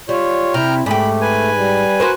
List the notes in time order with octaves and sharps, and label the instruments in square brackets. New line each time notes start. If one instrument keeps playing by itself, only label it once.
[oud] G3 [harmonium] F4 C#5
[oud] C3 [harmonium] E4 [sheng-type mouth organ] G5 A#5 F6
[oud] G#2 G4 [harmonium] A3 [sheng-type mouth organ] B5
[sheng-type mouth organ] B4 G#5
[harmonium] G3
[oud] F#4 A#4 C5